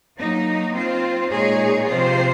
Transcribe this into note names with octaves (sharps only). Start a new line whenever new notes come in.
F#3 A#3 D#4
C4 F4 C5
A#2 G#3 D#4 G#4 C#5
C3 F3 C4 F4 C5